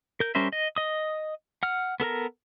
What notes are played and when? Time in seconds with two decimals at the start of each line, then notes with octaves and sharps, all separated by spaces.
0.20 A#4 G6
0.35 G3 C#4 A#4 C5 E5
0.52 D#5
0.76 D#5 D#6
1.63 F#5 F6
2.00 B3 A4 A#4 A#5